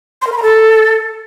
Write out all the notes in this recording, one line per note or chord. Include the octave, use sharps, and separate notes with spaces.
C6
A#4
B5
A#5
A4